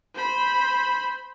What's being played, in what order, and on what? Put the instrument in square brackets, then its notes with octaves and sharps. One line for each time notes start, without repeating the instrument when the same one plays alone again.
[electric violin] C5 B5